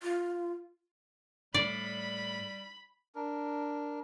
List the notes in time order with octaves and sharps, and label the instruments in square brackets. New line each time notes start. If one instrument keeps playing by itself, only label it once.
[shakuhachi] F4
[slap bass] A2 [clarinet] G3 [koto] D5 [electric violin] B5
[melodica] D4 A#4